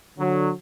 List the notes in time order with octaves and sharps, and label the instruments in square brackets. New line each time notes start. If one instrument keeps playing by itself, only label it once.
[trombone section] D3 F#3